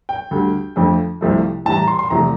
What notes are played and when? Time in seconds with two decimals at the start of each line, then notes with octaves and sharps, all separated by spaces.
0.09 G5
0.31 D2 D3 G3
0.76 F2 D3 F3 A3
1.21 C2 C3 F3 A3
1.65 A2 E3 G3 A5
1.77 A#5
1.88 C6
1.99 C6
2.10 E2 C3 F3 A3 A#5